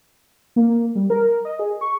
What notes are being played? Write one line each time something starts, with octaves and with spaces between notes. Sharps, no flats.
A#3
G3
A#4
D#5
G#4
C#6